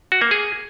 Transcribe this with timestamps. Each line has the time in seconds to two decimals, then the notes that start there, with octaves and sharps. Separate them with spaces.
0.12 F#4
0.22 A#3
0.31 G#4